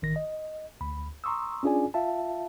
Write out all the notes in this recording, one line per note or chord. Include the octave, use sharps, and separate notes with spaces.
A1 D#3 A#6
D#5
D2 B5
A#5 C6 C#6 D#6 E6
C#4 D4 F4 G#4 D5 G#5
F4 E5 F5 A5